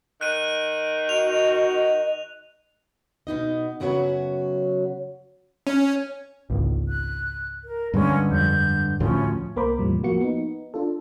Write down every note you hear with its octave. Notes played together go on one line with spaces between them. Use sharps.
D#3 F#6 D#7
F#4 D#5 F7
D#5
B2 B3 D#4 D#5
F#2 C#3 F#3 B3 F#4 C#5
C#4
G#1 C#2
F#6
A#4
G2 D3 G#3 C#4
F2 G6
D2 A2 F3 C#4
C2 A#3 A#4 C5 B5 D6
E2 A2 C3 F3 G3
F3 A#3 F#4 C#7
B3 D#4
D4 F4 A4